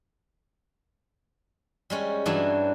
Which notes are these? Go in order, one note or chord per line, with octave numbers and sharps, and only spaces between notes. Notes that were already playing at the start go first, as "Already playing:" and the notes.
G3 G#3 C#4
G2 E3 F#3 G3 D4 F#4